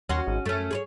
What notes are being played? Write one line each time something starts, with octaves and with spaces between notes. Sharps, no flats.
D#2 C#4 F#4 C6 A#6
G#1 G#3
F#2 A3 C#4
G#4 B4 C#5